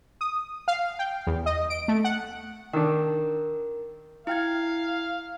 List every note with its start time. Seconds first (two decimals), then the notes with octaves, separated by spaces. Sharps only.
0.21 D#6
0.68 F5
0.99 G5
1.27 E2
1.46 D#5
1.70 D7
1.88 A3
2.04 F#5
2.73 D#3 D4 A#4
4.27 E4 F5 G5 G#6